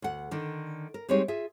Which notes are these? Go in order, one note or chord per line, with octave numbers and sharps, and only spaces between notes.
D2 F#5
D3 D#3 D4
A#4
G3 G#3 C4 D#4 G#4 C#5
F4 G#4 E5